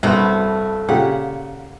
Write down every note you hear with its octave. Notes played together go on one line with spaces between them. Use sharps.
C2 G2 A3 B3 F#4 C6
A#2 C#3 G4 F#5